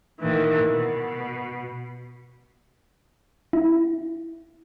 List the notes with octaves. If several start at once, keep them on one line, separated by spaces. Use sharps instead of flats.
A#2 D#3 E3
B2
E4